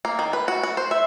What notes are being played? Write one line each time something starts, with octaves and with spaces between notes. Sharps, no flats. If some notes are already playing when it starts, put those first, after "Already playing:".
A#3
D#3
B4
F#4
F#4
C5
E5